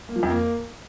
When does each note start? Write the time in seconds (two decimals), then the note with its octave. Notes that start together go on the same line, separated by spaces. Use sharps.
0.09 A#3
0.16 F3
0.23 F2
0.30 A#3